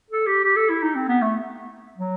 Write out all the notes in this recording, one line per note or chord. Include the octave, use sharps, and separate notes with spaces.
A4
G4
G4
A4
E4
D#4
C4
B3
A3
F#3